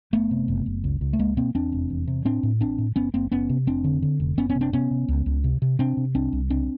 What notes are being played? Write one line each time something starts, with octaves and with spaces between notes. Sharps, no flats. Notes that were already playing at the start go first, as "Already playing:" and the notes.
F#1 A3 B3
C3
F#1
F#1
C#2
C#2
A3
C#2 G#3 A#3
B2 A#3 C4
E2 C4 D4
F1
E2
C3
A2 C4 D4
A2
A1 C4 D4
A2
F#1 B3 C#4
F#1 A#3 C4
F#1 B3 C#4
C3
F1 C4 D4
D3
D3
F1
F#1 B3 C#4
B3 C#4
C3
C4 D4
C3 B3 C#4
C3
C#2
C#2
C3
C3
C3 C4 D4
C3
C2 C4 D4
C2
C#2 C4 D4